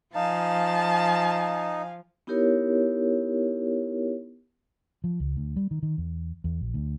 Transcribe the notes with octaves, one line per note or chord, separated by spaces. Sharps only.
F3 D#4 F5 G#5 A5
B3 D#4 E4 G4 A#4 C#5
F3
C#2
D2
G3
D#3
D#3
E2
E2
A#1
D2